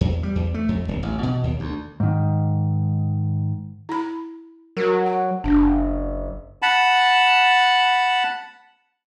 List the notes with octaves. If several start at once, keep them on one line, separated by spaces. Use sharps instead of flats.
E2
G3
E2
A3
F2
D#1
A1
B2
D#2
D2
G#2 D#3
E4 B5
F#3 F#4 A#4
F#5
F#1 D4
F#5 A5 B5